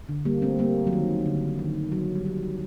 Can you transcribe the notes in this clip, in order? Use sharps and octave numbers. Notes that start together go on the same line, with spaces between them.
D3
G3 A#3
A3 C4
G3 A#3
F#3
D#3
D3
D#3
F#3
G3
F#3